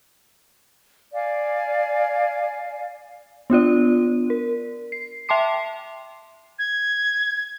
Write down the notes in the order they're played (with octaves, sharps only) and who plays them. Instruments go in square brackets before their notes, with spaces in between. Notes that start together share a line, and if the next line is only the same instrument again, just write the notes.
[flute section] D5 F5 G#5
[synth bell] B3 D4 F4 D5
A#4
C7
E5 G5 A5 C6 D6 C7
[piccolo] G#6